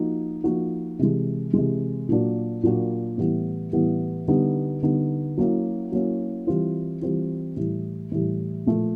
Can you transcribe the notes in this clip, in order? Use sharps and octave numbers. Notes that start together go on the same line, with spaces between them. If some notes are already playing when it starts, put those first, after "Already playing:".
Already playing: F3 A#3 D#4 F#4
F3 A#3 D#4 F#4
C3 E3 G#3
C3 E3 G#3
A#2 F#3 A#3 D4 F#4
A#2 F#3 A#3 D4 F#4
A2 E3 G3 B3
A2 E3 G3 B3
D3 G3 B3 D#4
D3 G3 B3 D#4
F#3 A#3 C#4 E4
F#3 A#3 C#4 E4
E3 G3 C4 F4
E3 G3 C4 F4
A2 E3 G3
A2 E3 G3
A#2 F3 A3